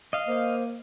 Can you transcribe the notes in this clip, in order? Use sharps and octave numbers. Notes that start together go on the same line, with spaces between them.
D#5 F5
A#3 C5